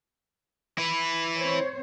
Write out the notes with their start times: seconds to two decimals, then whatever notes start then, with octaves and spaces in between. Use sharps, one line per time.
0.78 E4 B4
1.38 C4 C5 C#5